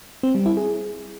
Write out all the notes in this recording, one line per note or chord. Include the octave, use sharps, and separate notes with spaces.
C4
G3
E4
G#4